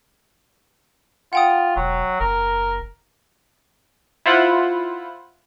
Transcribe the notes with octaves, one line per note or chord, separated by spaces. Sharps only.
F4 F#5 G5 D#6
E1 F#3
F#1 A#4
E4 F4 C5 F#5 B5